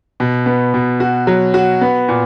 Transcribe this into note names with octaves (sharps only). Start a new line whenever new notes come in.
B2
B3
B2
F#4
F#3
F#4
B3
A#2